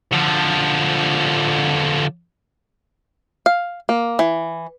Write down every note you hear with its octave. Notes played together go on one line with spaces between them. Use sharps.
D3 F3
F5
A#3
E3